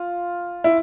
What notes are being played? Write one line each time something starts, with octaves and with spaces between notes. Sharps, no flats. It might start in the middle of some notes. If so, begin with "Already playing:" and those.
Already playing: F4
E4